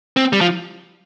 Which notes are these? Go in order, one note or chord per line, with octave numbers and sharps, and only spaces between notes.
C4
G3
F3